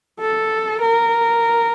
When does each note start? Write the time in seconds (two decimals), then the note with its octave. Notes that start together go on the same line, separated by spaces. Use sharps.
0.20 A4
0.81 A#4